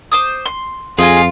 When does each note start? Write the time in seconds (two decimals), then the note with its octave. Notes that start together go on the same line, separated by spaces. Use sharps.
0.12 C5 D6 D#6
0.46 C6
0.98 F2 F4 G#4 D#5 G#5